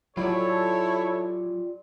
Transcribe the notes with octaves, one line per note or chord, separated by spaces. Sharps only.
F#3 E4 F4 G4 A4 C#5 D5